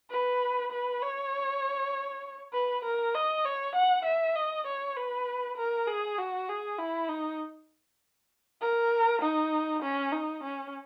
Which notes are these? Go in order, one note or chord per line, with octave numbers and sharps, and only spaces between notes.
B4
B4
C#5
B4
A#4
D#5
C#5
F#5
E5
D#5
C#5
B4
A#4
G#4
F#4
G#4
E4
D#4
A#4
D#4
C#4
D#4
C#4